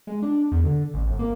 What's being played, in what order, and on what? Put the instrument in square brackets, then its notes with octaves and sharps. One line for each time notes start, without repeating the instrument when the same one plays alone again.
[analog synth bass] G#3
D4
E2
D3
A1
G1
A#3